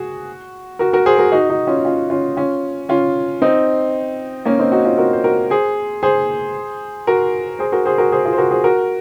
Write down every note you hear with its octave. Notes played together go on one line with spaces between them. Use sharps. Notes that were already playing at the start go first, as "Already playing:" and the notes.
Already playing: F#4 G#4
F#4 A#4
F#4 A#4
G#4 C5
F#4 A#4
D#4 F#4
D#4 F#4
C#4 F4
C#4 F4
C#4 F4
C#4 F4
C#4 F4
C4 D#4
A#3 C#4
C4 D#4
D#4 F#4
C#4 F4
F#4 A#4
C5
F#4 A#4
G#4 C5
G#4 C5
F#4 A#4
G#4 C5
F#4 A#4
G#4 C5
F#4 A#4
G#4 C5
F4 G#4
C5
F#4 A#4
G#4 C5
F#4 A#4